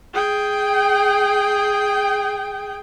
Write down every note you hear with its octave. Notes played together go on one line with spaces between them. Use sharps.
G#4 G5